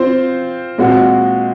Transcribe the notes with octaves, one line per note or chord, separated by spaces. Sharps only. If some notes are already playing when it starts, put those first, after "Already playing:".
Already playing: C4 F4 C5
A#2 G#3 C4 F#4